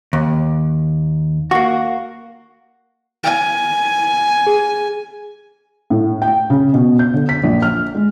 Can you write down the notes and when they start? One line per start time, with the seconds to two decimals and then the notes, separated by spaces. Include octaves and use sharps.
0.13 D#2
1.51 A#3 F#4
3.23 G#5
4.47 G#4
5.90 A2
6.22 G5
6.50 C#3
6.73 B2
6.99 G6
7.14 D3
7.29 B6
7.44 A#1
7.62 F6
7.95 G#3